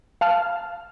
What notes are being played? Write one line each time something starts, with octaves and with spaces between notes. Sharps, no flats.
F5 A5 F6